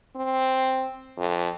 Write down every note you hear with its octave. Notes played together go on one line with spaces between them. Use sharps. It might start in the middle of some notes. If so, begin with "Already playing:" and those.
C4
F2